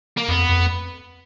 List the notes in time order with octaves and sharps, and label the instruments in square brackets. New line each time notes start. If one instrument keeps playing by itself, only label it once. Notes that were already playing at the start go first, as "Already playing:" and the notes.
[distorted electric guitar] A#3
[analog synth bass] F2 [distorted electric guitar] B3
[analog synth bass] F2